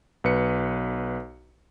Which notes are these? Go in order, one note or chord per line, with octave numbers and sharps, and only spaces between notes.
B1 B4 C#7